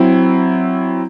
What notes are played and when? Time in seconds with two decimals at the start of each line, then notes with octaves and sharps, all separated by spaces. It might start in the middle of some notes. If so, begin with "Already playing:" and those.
Already playing: F#3 C4 E4